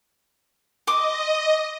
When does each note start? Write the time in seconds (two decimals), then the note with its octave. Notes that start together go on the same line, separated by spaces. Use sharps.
0.87 D#5 C6 D6 D#6